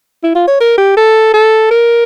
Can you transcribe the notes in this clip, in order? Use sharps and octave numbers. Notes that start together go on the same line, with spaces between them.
E4
F4
C#5
A#4
G4
A4
A4
A#4